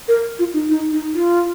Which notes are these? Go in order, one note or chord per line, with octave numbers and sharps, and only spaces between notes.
A#4
F4
D#4
D#4
D#4
F4